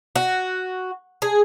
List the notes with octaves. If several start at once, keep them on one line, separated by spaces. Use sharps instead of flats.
F#4
G#4